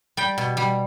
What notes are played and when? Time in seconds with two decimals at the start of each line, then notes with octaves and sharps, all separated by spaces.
0.17 G3 G5
0.38 B2
0.57 G3